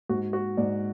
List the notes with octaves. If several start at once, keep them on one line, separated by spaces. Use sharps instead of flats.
G#2 F#4
F#4
G#2 D5